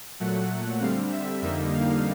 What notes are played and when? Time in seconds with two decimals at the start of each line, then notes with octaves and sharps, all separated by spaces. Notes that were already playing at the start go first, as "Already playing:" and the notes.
0.20 A#2 F#3 A3 F#5
0.81 D3 G3 C4 F5
1.12 E5
1.42 F2 D3 G3 A#3 D#4 E5
1.74 F5